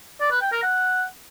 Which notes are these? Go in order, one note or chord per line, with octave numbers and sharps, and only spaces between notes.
D5
B4
G5
A#4
F#5